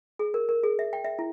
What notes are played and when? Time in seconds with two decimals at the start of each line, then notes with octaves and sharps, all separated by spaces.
0.19 G#4
0.34 A#4
0.49 A#4
0.64 G#4
0.79 E5
0.93 G5
1.04 E5
1.19 E4